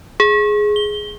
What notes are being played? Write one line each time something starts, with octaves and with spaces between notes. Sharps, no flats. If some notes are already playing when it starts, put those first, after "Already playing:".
G#4
G7